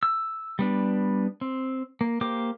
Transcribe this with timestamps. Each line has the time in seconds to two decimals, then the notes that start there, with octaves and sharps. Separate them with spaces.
0.03 E6
0.59 G3 B3 D4
1.41 C4
2.01 A#3
2.21 A#3 G4 C5 D6